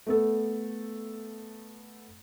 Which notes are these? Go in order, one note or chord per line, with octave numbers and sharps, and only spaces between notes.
A3 B3 A4